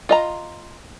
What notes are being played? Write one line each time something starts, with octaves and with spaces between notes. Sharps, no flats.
F4 D#5 A#5